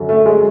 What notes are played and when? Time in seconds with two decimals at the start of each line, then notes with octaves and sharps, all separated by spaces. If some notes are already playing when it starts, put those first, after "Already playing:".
Already playing: F#2 D3 F#3
0.09 A3
0.26 G#3